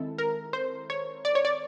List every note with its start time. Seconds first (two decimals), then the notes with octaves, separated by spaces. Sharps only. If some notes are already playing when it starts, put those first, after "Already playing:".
Already playing: D#3 G#3 C4 E4 A4
0.18 A#4
0.53 C5
0.90 C#5
1.25 D5
1.35 C#5
1.45 D5